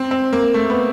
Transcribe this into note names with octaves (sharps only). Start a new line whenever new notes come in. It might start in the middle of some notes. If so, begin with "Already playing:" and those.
Already playing: C4
C4
A#3
A3
B3